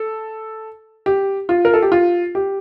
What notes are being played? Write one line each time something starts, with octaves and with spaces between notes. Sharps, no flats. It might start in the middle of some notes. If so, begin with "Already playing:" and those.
Already playing: A4
G4
F4
A#4
A4
G4
F4
G4